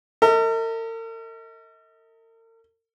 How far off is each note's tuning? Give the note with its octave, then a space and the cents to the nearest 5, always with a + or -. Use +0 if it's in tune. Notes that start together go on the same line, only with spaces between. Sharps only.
A#4 -45 D#5 +45